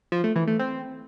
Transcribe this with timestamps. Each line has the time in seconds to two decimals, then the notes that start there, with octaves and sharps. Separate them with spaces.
0.12 F3
0.24 A3
0.36 E3
0.48 A3
0.59 C4